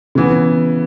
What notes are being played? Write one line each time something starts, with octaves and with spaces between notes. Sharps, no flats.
C#3 E3 B3